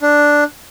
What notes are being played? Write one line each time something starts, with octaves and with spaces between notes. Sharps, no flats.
D4